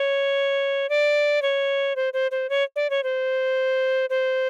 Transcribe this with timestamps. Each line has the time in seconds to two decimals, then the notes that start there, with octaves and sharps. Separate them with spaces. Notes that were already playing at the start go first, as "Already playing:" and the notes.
Already playing: C#5
0.89 D5
1.42 C#5
1.96 C5
2.13 C5
2.31 C5
2.50 C#5
2.76 D5
2.90 C#5
3.03 C5
4.10 C5